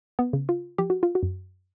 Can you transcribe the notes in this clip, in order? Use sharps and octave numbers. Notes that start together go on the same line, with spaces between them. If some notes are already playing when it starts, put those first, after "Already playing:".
B3
C#3
F4
F3 G4
F#4
F4
F#4
F#2